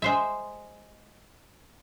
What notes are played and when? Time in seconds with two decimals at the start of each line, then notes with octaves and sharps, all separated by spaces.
0.02 G#3 C5 E5